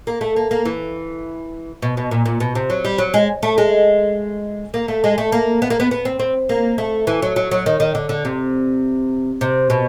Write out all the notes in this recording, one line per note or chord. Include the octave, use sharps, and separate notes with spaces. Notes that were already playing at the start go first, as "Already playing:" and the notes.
A#3
A3
A#3
A#3
E3
B2
B2
A#2
A#2
B2
C3
F#3
G3
F#3
G#3
A3
G#3
A#3
A3
G#3
A3
A#3
B3
A#3
B3
B3
C4
C4
A#3
A3
E3
F#3
F#3
F#3
D#3
D#3
D3
D3
C3
C3
B2